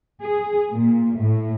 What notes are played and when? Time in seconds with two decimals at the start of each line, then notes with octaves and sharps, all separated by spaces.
0.21 G#4
0.73 A#2
1.17 A2